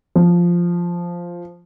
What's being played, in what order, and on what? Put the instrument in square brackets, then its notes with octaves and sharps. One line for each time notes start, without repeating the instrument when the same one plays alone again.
[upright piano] F3